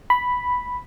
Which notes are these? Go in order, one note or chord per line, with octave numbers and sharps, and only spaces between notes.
B5